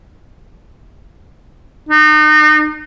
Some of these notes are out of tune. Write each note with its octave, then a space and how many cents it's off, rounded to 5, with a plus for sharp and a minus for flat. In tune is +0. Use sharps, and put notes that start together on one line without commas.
D#4 -35